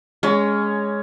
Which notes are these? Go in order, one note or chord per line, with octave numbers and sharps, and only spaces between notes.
G#3 C#4 A#5